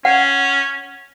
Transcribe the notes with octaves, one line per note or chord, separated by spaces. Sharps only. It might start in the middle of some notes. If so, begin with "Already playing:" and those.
C#4 F#5